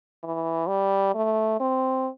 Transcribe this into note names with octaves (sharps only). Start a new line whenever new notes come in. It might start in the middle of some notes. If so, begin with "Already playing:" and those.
E3
G3
A3
C4